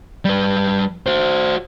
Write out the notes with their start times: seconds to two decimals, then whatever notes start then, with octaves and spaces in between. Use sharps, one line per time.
0.25 G3 B4
1.06 F#4 C5